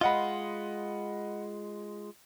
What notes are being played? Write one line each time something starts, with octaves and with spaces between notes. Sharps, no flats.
G#3 F4 D#5 F#5 B5